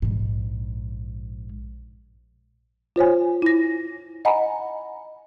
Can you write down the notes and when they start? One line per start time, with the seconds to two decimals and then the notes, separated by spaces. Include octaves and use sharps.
0.02 A#1 G#2
2.96 F4 C5 C#5 G#5
3.42 E4 A#6
4.25 D#5 F#5 G#5 A#5 B5